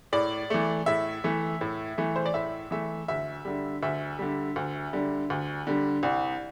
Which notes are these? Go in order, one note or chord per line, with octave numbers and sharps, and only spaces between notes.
A2 D5
E3 A3
A2 E5
E3 A3
A2
E3 A3
C5
D5
A2 E5
E3 A3 E5
D2 E5
D3 G3
D2 E5
D3 G3
D2
D3 G3
D2
D3 G3
C2